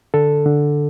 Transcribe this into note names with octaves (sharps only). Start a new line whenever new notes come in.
D3 A4
D3